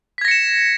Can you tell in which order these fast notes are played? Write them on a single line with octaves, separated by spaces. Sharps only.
B6 G#6 A#6 C#7 E7